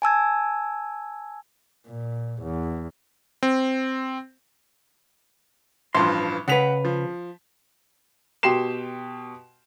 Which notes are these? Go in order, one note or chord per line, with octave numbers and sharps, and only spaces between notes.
G#5 A5 E6 G#6
A#2
E2
C4
A1 G2 F3 C6
C#3 B4 F#5 B6 F7
F3
B2 G4 G5 C6 C7 E7